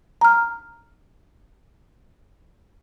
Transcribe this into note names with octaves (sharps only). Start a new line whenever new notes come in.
A#5 F6